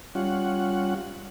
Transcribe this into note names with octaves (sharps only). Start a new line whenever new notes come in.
G3 C#4 F4 F#5